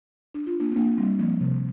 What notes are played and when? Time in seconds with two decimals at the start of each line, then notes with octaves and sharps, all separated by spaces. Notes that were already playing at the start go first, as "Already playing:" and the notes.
0.34 D4
0.47 F4
0.60 A#3 D4
0.72 C4
0.76 A#3 D4
0.98 G3 C4
1.19 F3 A#3
1.40 C3